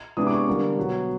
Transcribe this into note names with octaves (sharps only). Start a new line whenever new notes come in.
C3 E3 G#3 B3 D4 D#6
D6
C#6
D3 G3 A#3 D4
B2 F#3 B3